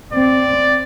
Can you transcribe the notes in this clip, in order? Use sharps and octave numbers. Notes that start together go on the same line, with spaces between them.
C4 D5